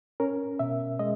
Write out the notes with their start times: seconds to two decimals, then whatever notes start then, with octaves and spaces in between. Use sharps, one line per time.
0.20 C#4 A#4
0.59 B2 E5
0.99 G#3 D#5